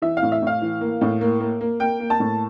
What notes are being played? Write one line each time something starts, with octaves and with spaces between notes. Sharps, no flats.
E3 E5
F5
A2
E5
A2 F5
E3
A#3
A2
A#3
A#3
A#3
A#3 G5
A#3
A5
A2